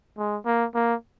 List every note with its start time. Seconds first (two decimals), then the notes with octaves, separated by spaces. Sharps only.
0.17 G#3
0.45 A#3
0.74 A#3